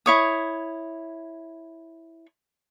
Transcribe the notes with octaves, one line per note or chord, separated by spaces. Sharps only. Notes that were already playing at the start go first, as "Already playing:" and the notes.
E4 C#5 D#6